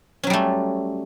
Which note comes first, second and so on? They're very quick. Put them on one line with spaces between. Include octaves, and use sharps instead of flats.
C#4 F#3 G3 A3